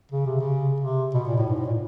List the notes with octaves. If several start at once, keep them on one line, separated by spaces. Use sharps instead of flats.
C#3
C3
C#3
C3
B2
A#2
A2
G#2
A2
A#2